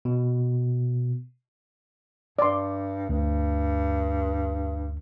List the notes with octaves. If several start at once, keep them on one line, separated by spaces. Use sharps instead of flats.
B2
G2 D5 C6
D2 G2